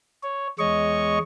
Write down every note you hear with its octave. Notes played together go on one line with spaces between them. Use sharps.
C#5
E2 G#3 C#5 D#5 C#6